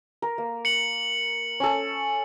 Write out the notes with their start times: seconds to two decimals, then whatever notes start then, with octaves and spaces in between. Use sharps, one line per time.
0.22 A#4
0.38 A#3
0.65 C#7 F#7
1.60 C#4 A4